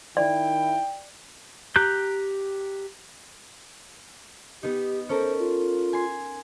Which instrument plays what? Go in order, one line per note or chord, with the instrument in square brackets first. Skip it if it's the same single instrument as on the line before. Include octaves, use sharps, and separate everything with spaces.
[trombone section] D#3 E4 [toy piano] D5 [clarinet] G5
[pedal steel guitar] G4 A#5 F#6 G6
[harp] B3 D#4 [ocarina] G4
[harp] C#4 A4 A#4 [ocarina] C5
[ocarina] F4
[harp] G#5 C6